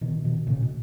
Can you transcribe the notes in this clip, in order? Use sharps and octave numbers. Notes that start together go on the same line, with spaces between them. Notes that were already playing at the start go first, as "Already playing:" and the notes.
B2 D#3
B2 D#3
A2 C#3
B2